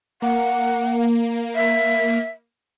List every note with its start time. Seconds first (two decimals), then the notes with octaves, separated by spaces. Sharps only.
0.22 A#3 F#5
1.55 E5